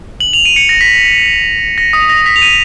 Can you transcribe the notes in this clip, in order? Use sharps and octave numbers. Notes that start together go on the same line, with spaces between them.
F#7
F7
D#7
C#7
A#6
B6
A#6
D#6
A#6
B6
F7
D#7